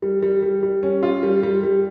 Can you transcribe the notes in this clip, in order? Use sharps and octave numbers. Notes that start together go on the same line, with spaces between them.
G3
G3
G3
G3
C#4
F4
G3
G3
G3